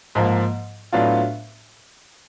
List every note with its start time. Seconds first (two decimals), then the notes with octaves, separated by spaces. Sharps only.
0.15 G#2 F3 A#3
0.93 A2 F#3 B3 D4 F4